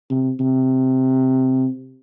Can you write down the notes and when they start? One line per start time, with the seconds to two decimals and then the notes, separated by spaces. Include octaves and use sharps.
0.10 C3
0.40 C3